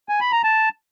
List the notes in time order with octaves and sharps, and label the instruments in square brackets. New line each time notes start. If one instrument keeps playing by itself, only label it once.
[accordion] G#5
B5
A#5
A5